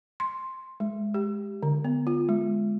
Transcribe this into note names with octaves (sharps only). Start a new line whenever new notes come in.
C6
G#3
G4
D3
B3
F4
G#3